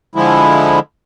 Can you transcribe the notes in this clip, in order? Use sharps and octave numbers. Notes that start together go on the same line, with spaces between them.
D3 F3 G#3 E4